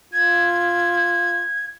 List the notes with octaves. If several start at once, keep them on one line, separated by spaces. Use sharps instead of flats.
F4 G#6